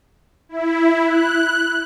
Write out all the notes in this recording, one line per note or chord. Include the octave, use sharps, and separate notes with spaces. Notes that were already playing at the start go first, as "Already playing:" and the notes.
E4
F#6